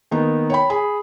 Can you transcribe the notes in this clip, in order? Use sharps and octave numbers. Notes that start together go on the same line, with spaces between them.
D#3 A#3 B3 D#4
C#5 G5 B5
G#4 B5